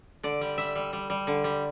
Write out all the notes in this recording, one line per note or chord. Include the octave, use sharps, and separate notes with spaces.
D3 D5
G3
G3 E5
G3
G3
G3
D3
G3